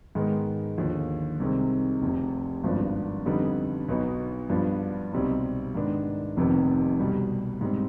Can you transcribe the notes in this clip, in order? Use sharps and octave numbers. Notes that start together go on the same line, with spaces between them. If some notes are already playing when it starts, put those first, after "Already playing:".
G#2 D#3 G#3 B3
D#2 D3 F3
C2 C3 D#3 G#3 C4
F1 F2 C3
G#1 G2 F3 B3 D4
F2 D3 G3 B3 D#4
B1 B2 B3 D#4
G2 F3 B3 D4
C2 B2 G3 C4 D#4
G#2 D#3 B3 D4
F1 F2 C3 D#3 B3
C2 B2 G3
G#2 G3 C4